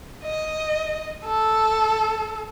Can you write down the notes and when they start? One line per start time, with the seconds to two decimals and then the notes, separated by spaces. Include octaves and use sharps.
0.24 D#5
1.25 A4